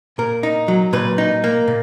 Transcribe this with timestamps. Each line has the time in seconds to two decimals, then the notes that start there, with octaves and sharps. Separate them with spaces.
0.18 A#2 A#4
0.43 D#4
0.68 F#3
0.93 A#2 B4
1.18 D#4
1.44 A#3
1.68 A#2